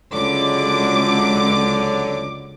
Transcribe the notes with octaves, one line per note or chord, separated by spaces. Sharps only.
C#2 D3 F#3 D6